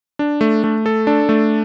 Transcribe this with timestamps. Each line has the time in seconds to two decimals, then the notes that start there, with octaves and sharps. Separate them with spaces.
0.19 D4
0.41 A3
0.64 A3
0.86 A4
1.07 D4
1.29 A3